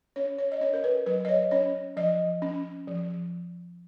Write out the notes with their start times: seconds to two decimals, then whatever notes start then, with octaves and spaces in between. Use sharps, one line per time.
0.16 C#4 C#5
0.38 C#5
0.52 D#5
0.61 C#4 C#5
0.74 A#4
0.84 B4
1.06 F#3 B4
1.25 D#5
1.29 C#5
1.51 C#4 C#5
1.97 F3 D#5
2.42 C#4
2.87 F3